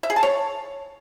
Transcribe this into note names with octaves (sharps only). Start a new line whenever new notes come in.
E5
G#4
A5
C#5